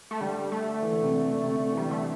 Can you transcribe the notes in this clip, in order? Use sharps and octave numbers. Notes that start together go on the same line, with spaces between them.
A3
D3 G3
A3
E3
D3
C3
D3
D3
C3
D3
E3 G3
D3 A3